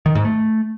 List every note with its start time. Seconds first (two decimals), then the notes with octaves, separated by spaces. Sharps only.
0.06 D#3
0.15 G#2
0.25 A3